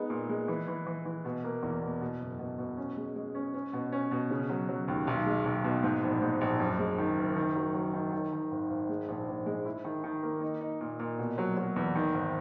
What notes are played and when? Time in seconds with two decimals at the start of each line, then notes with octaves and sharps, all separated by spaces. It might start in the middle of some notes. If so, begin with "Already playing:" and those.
Already playing: G#3 B3 D#4
0.10 A#2
0.29 G#3
0.48 E3
0.68 E3
0.86 E3
1.05 E3
1.25 B2
1.44 A#3
1.63 E2
1.82 B2
2.01 B2
2.20 F#1
2.39 B2
2.58 B2
2.77 C#4
2.97 G#3
3.16 G#3
3.35 C#4
3.54 C#4
3.73 B2
3.92 C#4
4.11 B2
4.30 C#3
4.50 F#3
4.69 F#3
4.88 D#2
5.07 B1
5.26 G#3
5.45 B1
5.64 B2
5.83 G#2
6.03 A#1
6.22 G#2
6.41 A#1
6.60 F#2
6.79 G#3
6.98 D#3
7.17 F#1
7.36 D#3
7.56 F#3
7.74 F#3
7.94 D#3
8.13 D#3
8.32 D#3
8.51 G#1
8.70 G#1
8.89 G#3
9.08 A#1
9.28 A#1
9.46 G#3
9.66 E4
9.84 D#3
10.04 D#3
10.23 A#3
10.42 D#4
10.61 D#4
10.80 A#2
10.99 A#2
11.19 B2
11.38 F#3
11.57 F#3
11.76 E2
11.95 D#3
12.14 G#1